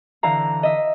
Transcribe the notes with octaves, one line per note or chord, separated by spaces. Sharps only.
D3 E3 F5 A#5
D#5 E5